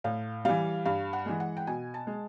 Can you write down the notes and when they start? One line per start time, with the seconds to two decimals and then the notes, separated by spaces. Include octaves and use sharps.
0.04 A2 F5
0.45 E3 G3 F5
0.85 G2 F5
1.13 F#5
1.26 E3 G#3
1.40 F#5
1.57 G5
1.67 B2 G#5
1.94 A5
2.07 G#3